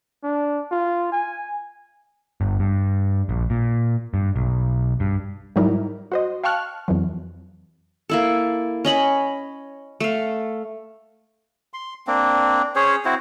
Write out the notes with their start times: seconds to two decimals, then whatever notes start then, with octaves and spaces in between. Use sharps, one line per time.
0.23 D4
0.71 F4
1.12 G#5
2.41 G1
2.59 G2
3.29 A#1
3.50 A#2
4.14 G2
4.36 B1
5.00 G2
5.56 G#2 F#3 G3 D#4 E4 A#4
6.12 F#4 C5 D#5
6.44 F5 G5 A5 C#6 F6 F#6
6.88 F2 E3 F#3
8.09 A#3 E4 A4
8.85 C#4 D#5 B5
10.00 A3 F5
11.74 C6
12.07 A#3 C4 D4
12.76 C#4 G#4 C5 C#5
13.05 C4 E4 F#4 C5